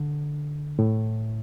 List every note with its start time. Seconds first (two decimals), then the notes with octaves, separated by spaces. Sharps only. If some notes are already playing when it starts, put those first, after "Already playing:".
Already playing: D3
0.79 A2